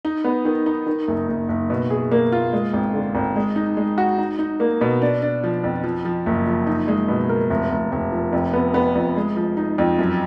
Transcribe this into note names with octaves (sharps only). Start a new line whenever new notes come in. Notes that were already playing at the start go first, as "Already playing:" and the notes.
D#4
B3
D#3
D#4
D#3
F#1
F#1
F#1
B2
G#4
A#3
F4
G#3
G#1
D3
G#1
G#3
D#4
G#3
F#4
D#4
D#4
A#3
B2
D4
D4
F3
F2
F3
F3
F#1
F3
D#4
G#3
B2
A#4
F1
F1
F1
F3
F2
B3
B3
F2
G#3
F3
D#4
F2
F#2